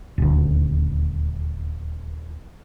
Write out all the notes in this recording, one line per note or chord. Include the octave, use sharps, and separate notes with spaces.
D#1 D2